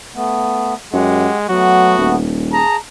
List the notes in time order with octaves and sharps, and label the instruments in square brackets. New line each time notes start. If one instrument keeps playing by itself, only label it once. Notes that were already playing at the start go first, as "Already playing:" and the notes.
[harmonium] A3 B3
[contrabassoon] F#2 [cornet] G#3 [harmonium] G4 F#5
[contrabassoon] F#3 [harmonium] A3 B3 [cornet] F#4
[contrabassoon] D#1
[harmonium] G#4 A5 [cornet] A#5